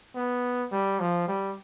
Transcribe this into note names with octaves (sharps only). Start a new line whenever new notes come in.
B3
G3
F3
G3